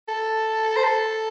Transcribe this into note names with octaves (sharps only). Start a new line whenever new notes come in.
A4
C5
A4